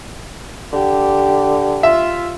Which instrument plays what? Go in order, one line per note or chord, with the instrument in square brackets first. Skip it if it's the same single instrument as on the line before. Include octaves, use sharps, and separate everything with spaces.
[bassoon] D3 [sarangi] G4
[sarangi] F4 [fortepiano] E5